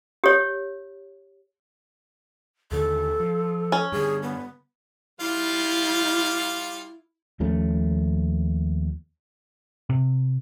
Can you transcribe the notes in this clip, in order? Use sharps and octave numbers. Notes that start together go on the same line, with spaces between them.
G4 C#5
D#2 D3 D#3 A4
F3
C#4
G2 D3 G#4
B3
G3 E4 F4 F5
D#2 F3 A3 C#4
C3